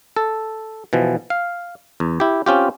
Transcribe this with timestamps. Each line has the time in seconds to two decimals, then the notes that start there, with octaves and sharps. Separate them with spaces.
0.16 A4
0.93 B2 E3 F3
1.30 F5
2.00 E2
2.20 E4 G4
2.46 C4 C#4 F4 G4